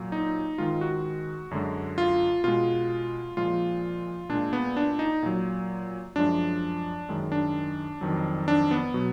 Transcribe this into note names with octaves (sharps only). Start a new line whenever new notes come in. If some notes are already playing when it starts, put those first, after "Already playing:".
Already playing: A#2 F#3
D#4
G#2 D#3 G#3 F4
F#4
F#2 D3 G#3
F4
B2 G#3 F4
A#2 F3 G#3 F4
A#2 G#3 D4
B3
D4
D#4
A#2 F#3
F#2 F3 G#3 D4
F#2 D#3 G#3
D4
F2 D#3 F#3
D4
B3
B2 F#3